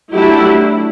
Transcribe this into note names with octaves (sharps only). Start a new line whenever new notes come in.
F#3 A3 D4 E4 G4